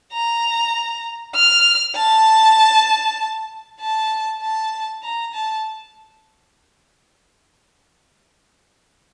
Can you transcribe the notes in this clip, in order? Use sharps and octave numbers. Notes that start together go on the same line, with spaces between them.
A#5
F6
A5
A5
A5
A#5
A5